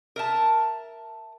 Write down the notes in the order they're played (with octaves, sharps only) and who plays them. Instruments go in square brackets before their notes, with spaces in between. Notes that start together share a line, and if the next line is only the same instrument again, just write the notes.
[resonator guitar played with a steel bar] A#4 E5 A5